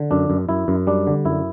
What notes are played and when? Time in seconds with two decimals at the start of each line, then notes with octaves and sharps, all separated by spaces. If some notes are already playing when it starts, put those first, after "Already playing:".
Already playing: D3
0.11 F#2 D4
0.30 F#2
0.49 F#2 E4
0.68 F#2
0.87 G3 D4
1.07 D3
1.25 F#2 E4